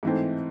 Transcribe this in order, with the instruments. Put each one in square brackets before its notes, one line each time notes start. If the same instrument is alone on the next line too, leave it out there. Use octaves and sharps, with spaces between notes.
[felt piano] G#2 E3 A3 C4